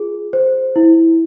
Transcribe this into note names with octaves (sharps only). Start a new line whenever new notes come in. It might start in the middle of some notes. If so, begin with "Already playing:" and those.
Already playing: F4 G#4
C5
E4